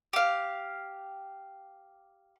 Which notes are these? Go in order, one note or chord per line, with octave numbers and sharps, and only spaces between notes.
G4 F5